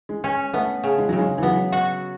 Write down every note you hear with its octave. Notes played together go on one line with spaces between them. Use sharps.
G#3
C#4
A3 B3
C#3
G#3
C#3 F#3
G#3
E3
F#3 B3
F#4